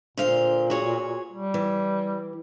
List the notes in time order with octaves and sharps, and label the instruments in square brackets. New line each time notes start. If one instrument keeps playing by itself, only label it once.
[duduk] A#2 [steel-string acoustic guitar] D3 C5 F5
[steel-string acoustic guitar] F#4 G#4 C#5
[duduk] G3
[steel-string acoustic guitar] E3